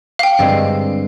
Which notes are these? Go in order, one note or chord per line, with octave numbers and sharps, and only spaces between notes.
F5
G5
G2 D3 G#3 C4